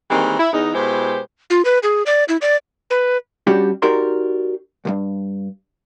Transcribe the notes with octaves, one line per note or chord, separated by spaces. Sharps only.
D#3 E3 G3 G#3 A#3 C4
E4
E2 D#4
B2 G#3 E4 G4 B4 C5
F4
B4
G#4
D5
E4
D5
B4
G3 C#4 D4 F#4 G4
D#4 F#4 G4 A#4 D5 C6
C2 G2